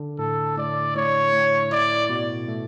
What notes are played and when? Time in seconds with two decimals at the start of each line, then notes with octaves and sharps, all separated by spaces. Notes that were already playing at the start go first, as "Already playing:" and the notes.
Already playing: D3 D4
0.18 A2 A4
0.57 A2 D5
0.95 A2 C#5
1.33 A2
1.72 E4 D5
2.09 B2
2.48 A3